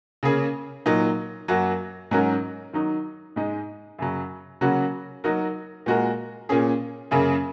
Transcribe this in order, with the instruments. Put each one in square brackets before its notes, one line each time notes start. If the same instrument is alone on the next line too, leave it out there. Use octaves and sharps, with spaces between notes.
[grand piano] C#3 A#3 C#4 G#4
A#2 F#3 D#4 A#4
F#2 F#3 A#3 F#4
G#2 F#3 C#4 F#4 A#4
D#3 F#3 D#4
G#2 G#3 D#4
F#2 C#3 F#3
C#3 F#3 A#3 C#4 F#4
F#3 D#4 F#4 A#4
A#2 G#3 F#4 A#4
A#2 A#3 C#4 G#4
F#2 C#3 A#3 C#4